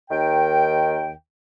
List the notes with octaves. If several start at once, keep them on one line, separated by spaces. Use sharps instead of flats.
D#2 D#3 G5